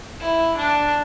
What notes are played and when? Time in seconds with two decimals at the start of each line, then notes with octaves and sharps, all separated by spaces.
0.20 E4
0.57 D4